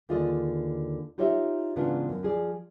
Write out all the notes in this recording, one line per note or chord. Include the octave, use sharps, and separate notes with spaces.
D#2 D3 F4 G#4 D5 D#5
D#4 F4 G4 C#5 D#5 E5
G#2 C#3 E3 B3 D4 F4
F#2
F3 G#4 D5